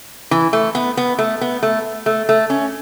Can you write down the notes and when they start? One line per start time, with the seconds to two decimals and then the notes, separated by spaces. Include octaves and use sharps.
0.31 E3
0.53 A3
0.75 B3
0.97 B3
1.19 A3
1.41 B3
1.63 A3
2.06 A3
2.29 A3
2.50 C#4